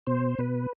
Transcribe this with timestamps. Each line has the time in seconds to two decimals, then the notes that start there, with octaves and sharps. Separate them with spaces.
0.07 B2 C5
0.39 B2 B4